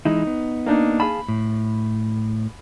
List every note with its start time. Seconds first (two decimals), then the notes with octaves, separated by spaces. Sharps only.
0.05 E3 G#3 D#4 E4
0.27 B3
0.66 A#3 D4 D#4
1.00 G#4 F5 A5 B5
1.28 A2